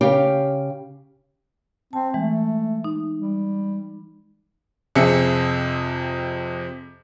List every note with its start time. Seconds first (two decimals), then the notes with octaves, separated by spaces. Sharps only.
0.01 C#3 G4 F5 G5
1.93 C4 A5
2.14 E3 G#3 A3
2.84 D#4
3.19 G3
4.96 F2 C3 C4 G#4 E5 C#7